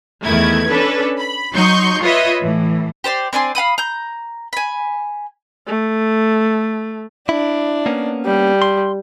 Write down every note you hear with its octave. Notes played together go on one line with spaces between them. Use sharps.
E2 D#3 A3 E4 G#6
C#4 D4 A4 B4
B5
F#3 D#4 C6 C#6 G6
F4 B4 C#5 D#5 E5
A2 E3
G4 C5 D5 C6
C4 D4 G#5 C6
F5 F#5 B5 D#6
A#5 G6
G#5 B5
A3
D4 E4
A#3 B3 C#4
G3
C6